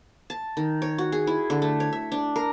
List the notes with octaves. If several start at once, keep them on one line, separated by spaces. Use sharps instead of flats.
A5
D#3
C#5
F#4
G#4
E4
D3
A3
C#5
E5
D4
A#4